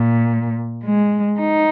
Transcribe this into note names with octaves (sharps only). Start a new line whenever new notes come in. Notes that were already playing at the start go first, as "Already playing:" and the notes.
Already playing: A#2
G#3
D#4